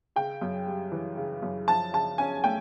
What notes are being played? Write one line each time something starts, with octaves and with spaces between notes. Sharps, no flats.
C#3 G5
F#2
G3
E3
C#3
F#2
F3 A5
C#3 A5
C#4 G#5
A3 G5